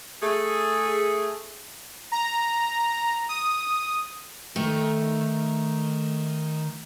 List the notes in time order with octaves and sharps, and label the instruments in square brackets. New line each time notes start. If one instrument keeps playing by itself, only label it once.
[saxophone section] A3 G#4
[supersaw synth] A#5
D#6
[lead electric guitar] D#3 G5 [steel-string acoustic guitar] A3